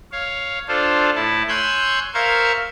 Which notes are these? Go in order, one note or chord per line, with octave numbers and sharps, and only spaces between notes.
C#5 F5
D4 F4 A4 C5
A2 E4 A5
C#5 G#5 C6 E6 F#6 G6
A#4 C5 E5 F5 C#6 G#6